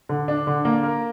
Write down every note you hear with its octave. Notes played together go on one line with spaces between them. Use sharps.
D3
D4
D3
A#3
A#4